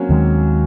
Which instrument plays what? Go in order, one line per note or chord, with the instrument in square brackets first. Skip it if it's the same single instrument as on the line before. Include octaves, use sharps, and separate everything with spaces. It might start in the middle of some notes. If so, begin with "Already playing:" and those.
Already playing: [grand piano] F#3 A#3 C4 C#4
[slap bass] D#2 D#3 G#3